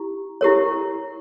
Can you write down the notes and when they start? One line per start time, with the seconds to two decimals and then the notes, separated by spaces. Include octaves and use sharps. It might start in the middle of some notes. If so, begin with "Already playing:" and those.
Already playing: E4 G4
0.41 E4 G4 A#4 C#5